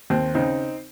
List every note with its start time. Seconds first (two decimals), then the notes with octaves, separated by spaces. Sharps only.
0.10 D#2 C4
0.35 C#3 C4 D#4